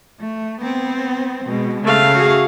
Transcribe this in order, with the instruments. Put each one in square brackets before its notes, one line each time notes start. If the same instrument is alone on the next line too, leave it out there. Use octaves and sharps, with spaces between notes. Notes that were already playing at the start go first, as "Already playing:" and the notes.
[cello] A3
B3 C4
B2 G#3
[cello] C#3 [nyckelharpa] A3 F5
[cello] F#4 G#4